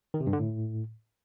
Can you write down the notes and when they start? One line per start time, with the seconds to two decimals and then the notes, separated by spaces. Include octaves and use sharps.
0.14 D#3
0.20 C3
0.27 G2
0.33 D3
0.39 A2